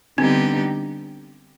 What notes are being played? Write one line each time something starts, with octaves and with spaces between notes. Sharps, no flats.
D3 G3 B3 C4 D4 D#4 G4